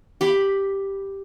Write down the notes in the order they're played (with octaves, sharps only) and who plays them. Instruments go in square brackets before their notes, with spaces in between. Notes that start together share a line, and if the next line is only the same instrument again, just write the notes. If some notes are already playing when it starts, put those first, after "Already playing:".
[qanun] G4 B5